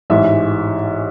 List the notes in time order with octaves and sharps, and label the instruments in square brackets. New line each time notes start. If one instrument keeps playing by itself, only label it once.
[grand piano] A1 G#2 E3 E5